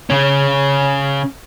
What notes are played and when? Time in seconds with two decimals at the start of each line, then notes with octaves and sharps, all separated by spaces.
0.10 C#3 C#4